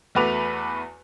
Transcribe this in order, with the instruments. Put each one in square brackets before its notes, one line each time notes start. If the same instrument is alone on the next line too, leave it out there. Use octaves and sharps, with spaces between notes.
[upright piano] E2 A3 F#4 B4 D6 F7